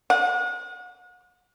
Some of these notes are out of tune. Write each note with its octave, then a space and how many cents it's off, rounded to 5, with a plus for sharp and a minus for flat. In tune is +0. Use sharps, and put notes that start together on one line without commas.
F#5 -40